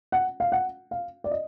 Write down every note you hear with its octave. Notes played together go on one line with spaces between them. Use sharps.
F#5
F5
F#5
F5
D5
D#5